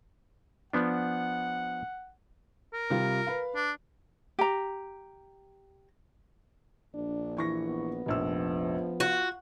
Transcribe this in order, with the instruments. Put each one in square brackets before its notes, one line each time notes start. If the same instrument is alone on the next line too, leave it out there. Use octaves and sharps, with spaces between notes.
[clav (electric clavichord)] F3 B3 D4 [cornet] F#5
[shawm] A#4
[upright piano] C3 G3 F4
B4 F5
[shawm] D4
[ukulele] G4 A#5
[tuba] A#1 [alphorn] D4
[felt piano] E3 C#6 A#6
[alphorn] B3
[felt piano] F1 A#1 E6 [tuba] F3
[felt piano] F4 [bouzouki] F#4